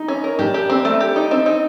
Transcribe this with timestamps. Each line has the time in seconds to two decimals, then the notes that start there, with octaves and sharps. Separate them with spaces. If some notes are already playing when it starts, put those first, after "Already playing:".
Already playing: D#4
0.08 C#4
0.24 A#4
0.39 D4 G4
0.54 G4
0.70 C4
0.85 A3
1.00 G4
1.16 D#4
1.31 C4
1.46 D#4